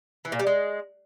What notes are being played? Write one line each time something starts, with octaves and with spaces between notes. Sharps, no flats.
E3
A#2
G3
G#3